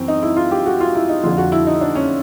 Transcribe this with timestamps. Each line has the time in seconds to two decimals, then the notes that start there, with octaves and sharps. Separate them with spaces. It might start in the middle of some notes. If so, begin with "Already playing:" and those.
Already playing: F#2 E3 C4
0.08 D#4
0.23 E4
0.37 F4
0.51 G4
0.66 F#4
0.80 F4
0.95 E4
1.09 D#4
1.24 F2 D3 F3 F4
1.38 F#4
1.52 E4
1.67 D#4
1.81 D4
1.95 C#4